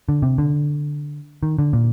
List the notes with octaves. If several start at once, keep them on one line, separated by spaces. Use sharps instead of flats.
D3
C3
D3
D#3
D3
A#2